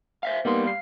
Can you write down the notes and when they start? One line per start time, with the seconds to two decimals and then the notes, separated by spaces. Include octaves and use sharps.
0.23 C5 E5 F5
0.45 G3 A#3 B3 D#4 C6
0.65 F5 C7